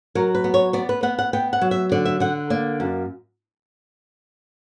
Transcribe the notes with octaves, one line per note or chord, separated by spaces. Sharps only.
F#3 A#4
B4
B3
C#5
B3 D5
B4
B3 F#5
F#5
B3 G5
F#5
F#3
E5
D3 D5
E5
D3 F#5
A#3 D5
F#2